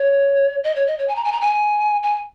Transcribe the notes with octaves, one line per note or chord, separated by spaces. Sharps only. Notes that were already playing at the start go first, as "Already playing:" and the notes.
Already playing: C#5
D#5
C#5
D#5
C#5
G#5
A#5
G#5
A#5
G#5
G#5